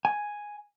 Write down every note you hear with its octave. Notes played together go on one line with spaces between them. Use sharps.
G#5